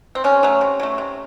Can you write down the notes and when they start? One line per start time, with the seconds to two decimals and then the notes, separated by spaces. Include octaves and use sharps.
0.15 C4
0.24 C3 C#4
0.43 F#3 A3
0.61 C3
0.80 F#3 A3
0.98 C3